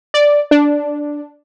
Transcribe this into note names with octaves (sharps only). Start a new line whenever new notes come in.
D5
D4